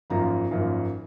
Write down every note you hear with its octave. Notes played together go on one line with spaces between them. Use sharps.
G#1 F#2 F3 A#3 A#5
G#1 F#2 F3 A#3